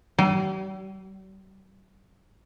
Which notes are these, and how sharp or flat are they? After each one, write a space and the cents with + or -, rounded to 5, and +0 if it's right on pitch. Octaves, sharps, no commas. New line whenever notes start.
G3 -45